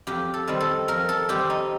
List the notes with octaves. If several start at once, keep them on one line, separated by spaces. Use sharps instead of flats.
F2 G4
A4
D#3 G3 C4
A4
F2 A#4
A4
D#3 G3 C4 G4
D#4